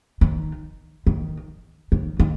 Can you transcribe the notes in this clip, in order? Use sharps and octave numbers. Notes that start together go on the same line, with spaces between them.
D#3
D#3
D#3
D#3